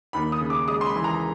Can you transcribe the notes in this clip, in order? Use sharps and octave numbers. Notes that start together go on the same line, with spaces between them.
D#2 B5
D#6
C#3
D6
G#3 D#6
C6
B5
E3
A#5